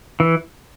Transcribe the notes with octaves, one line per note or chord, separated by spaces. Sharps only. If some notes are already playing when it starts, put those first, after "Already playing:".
E3